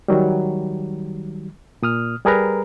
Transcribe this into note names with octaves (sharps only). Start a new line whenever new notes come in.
D#3 F#3 G3
A#2 D#6 F6
G3 G#4 A#4 B4 A#5